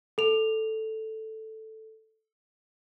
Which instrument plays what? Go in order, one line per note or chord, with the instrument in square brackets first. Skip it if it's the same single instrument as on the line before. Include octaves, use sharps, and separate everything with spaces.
[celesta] A4 F7